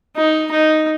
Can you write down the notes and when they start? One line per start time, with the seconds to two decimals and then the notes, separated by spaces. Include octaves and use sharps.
0.17 D#4
0.51 D#4